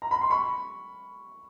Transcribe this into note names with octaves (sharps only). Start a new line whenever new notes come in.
A#5
B5
C6
B5 C#6